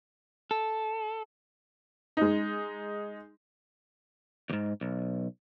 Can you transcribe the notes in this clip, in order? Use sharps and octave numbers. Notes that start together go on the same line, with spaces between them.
A4
G#3 D#4
D#2 G#2
B1